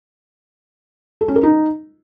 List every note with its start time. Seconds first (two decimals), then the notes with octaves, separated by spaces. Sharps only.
1.21 A4
1.28 C#4
1.36 A#4
1.43 D#4